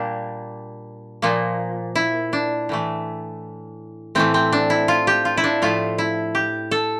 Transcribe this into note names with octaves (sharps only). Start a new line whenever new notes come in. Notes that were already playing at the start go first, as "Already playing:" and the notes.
Already playing: A#2 G3 A#3 D4
A#2 F3 A#3
E4
D4
A2 E3 A3
A2 E3 A3 C4
C4
D4
E4
F4
G4
F4
E4
D4
A2 F3 A3 F4
E4
G4
A4